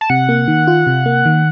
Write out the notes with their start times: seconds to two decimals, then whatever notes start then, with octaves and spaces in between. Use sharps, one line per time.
0.01 A5
0.10 C3 F#5
0.29 A#3
0.48 D#3
0.67 F4
0.87 C3
1.06 A#3
1.25 D#3